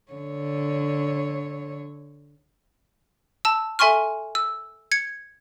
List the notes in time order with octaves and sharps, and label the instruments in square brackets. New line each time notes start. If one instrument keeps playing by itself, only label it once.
[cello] D3 C#5
[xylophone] A5 E6
A4 E5 G#5 C6 C#6 F6
E6
G#6 C#7